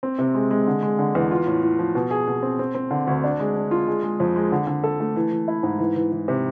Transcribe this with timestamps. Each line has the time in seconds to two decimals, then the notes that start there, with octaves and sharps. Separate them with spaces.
0.03 C4
0.19 C3
0.34 G#3
0.51 G#3
0.67 D3
0.82 G#3
0.99 D3
1.15 E2
1.31 F4
1.46 A2
1.63 A2
1.79 F3
1.95 B2
2.11 G#4
2.27 B2
2.43 C4
2.59 C4
2.75 C4
2.91 D3
3.07 D2
3.24 D4
3.40 G#3
3.55 D4
3.71 F4
3.87 G#3
4.03 G#3
4.20 F2
4.36 G#3
4.52 D3
4.67 D3
4.84 A4
5.00 A3
5.16 E3
5.32 E3
5.48 E4
5.63 G#2
5.79 E3
5.96 E3
6.12 E3
6.28 C3